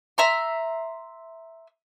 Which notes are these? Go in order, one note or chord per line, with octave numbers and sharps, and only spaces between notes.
E5 A#5 C6